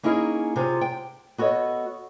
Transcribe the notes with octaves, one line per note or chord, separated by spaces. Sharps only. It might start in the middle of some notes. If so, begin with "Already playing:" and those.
A#3 C#4 D#4 E4 G#4
C3 F4 G#4
G5
B3 F#4 A4 C#5 D#5